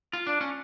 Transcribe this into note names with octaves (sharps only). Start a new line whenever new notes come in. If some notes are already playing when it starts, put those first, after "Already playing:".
F4
D4
C#4